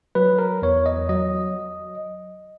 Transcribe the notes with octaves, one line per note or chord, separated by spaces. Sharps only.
F#3 B4
A#4
E2 C#5
D#5
F#3 D#5